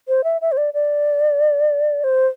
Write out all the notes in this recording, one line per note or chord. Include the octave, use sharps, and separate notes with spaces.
C5
E5
E5
C5
D5
D5
C5